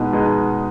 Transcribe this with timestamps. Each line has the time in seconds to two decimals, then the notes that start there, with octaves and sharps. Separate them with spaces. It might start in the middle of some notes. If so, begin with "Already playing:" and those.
Already playing: B2 G#3 B3 D#4
0.13 B2 G#3 B3 D#4